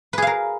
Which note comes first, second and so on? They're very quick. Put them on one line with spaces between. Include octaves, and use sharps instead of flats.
B4 G#4 F5 A#4